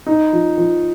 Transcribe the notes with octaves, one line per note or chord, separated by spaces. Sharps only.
D#4
F3
F3